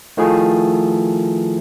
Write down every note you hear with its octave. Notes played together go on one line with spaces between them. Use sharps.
D#3 F3 A3 E4 G#4